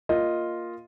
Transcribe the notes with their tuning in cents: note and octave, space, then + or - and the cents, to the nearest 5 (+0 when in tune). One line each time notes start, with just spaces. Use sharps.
A#3 +0 F4 +0 D#5 +0